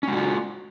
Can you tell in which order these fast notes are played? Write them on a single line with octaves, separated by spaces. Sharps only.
C#4 G#3 F#4 F4